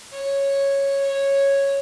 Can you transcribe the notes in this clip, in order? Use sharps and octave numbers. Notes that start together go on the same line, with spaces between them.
C#5
C#5